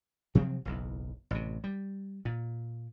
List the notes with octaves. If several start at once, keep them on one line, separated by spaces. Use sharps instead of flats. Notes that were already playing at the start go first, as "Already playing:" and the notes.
C3 F3 F#3 C4
F#1 B1 E2
A1 C3
G3
A#2